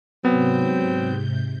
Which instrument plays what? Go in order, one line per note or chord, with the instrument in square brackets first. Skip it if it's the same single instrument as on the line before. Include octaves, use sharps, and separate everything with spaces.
[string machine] G#2 C3 G6 [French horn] F#3 [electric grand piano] B3 [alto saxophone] C4